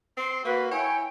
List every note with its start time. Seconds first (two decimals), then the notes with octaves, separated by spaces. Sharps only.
0.17 C4 C6
0.45 A#3 F#4 B4
0.72 E4 C#5 G5 G#5